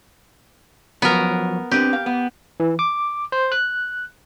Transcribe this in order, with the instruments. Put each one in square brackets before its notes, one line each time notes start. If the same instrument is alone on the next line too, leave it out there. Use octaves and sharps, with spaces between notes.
[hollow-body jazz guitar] F3 F#3 C#4 [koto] B3 A#4
[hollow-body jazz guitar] C4 D4 B4 [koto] G4
[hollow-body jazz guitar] F5
B3
[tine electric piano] E3
D6
C5
F#6